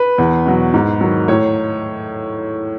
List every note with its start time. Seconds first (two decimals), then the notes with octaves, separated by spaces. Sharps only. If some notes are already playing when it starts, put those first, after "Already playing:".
Already playing: B4
0.18 E2
0.46 B2 F#3
0.74 G#2
1.01 D#3 F#3
1.28 A2 C#5